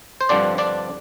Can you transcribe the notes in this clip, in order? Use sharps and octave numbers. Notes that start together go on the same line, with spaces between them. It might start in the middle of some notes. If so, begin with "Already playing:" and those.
C5
G2 D3 F3 C4 D4 D5
D4 D5